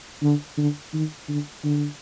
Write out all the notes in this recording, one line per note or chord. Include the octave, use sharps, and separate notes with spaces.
D3
D3
D#3
D3
D3